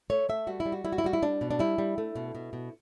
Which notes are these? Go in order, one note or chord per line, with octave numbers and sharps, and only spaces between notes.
A3 C#5
A3 E5
G3 F#4
E4
G3
F#4
G3 E4
F#4
E4
G3 F#4
E4
G3 D4
B2
D4
G3 E4
G3
A3
B2
B2
B2